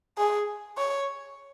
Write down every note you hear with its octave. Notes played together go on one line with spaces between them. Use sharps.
G#4
C#5